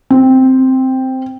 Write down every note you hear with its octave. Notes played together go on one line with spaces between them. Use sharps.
C4